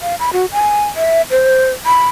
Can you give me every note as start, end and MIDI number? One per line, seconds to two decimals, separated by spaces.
0.01 0.15 77
0.20 0.33 83
0.33 0.46 66
0.52 0.86 80
0.97 1.22 76
1.31 1.71 72
1.86 2.08 83